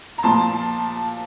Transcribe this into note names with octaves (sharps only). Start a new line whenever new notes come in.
A#5
A#2 F3 A5 C6